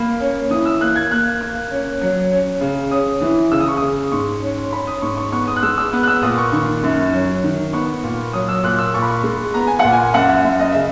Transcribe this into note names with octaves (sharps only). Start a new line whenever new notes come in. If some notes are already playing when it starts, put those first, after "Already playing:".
Already playing: A#3 B5
C#4
E3 D#6
E6
A#3 F#6
G#6
A#3 F#6
A#3
C#4
F#3
C#4
C#3
C#4 D#6
E3
C#3 E6
D#6
C#6
D#6
C#3
G#2 C#6
C#4
C#4 B5
D#6
G#2 C#6
C#6
B3 C#6
D#6
F#6
G#3 E6
E6
B3
F#6
E6
A#2 D#6
C#6
D#3 C#6
F#2
F#3
D#3
B3 C#6
A#2
F#3 D#6
E6
A#2 F#6
E6
A#2 C#6
B5
C#6
G#3
B3 A#5
G#5
A#2 F#5
G#5
F#2 F#5
E5
F#2
D#5
C#3 E5